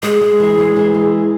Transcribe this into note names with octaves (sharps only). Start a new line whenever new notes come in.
G#3 G#4
G#3
E3
G#3
E3
G#3